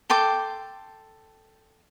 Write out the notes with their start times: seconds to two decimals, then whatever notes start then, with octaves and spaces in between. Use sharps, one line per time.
0.10 A4 G5 C6 D6